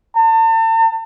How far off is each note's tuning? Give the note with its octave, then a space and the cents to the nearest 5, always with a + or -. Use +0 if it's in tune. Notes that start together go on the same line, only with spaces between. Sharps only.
A5 +40